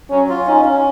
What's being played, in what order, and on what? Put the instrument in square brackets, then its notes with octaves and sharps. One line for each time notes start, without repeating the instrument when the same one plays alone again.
[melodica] F#3 [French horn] C#4
[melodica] F4
[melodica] C#4 [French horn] D#4
[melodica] C#4